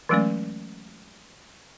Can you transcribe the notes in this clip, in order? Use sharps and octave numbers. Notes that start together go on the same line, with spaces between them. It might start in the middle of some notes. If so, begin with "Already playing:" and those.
E3 F#3 G#3 A3 C#4 D5